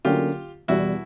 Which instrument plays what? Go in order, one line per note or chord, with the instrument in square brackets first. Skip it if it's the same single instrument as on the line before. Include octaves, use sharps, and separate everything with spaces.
[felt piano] D3 F#3 A#3 C#4 [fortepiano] F4 G4
[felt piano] E2 B2 G3 [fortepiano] E4 F#4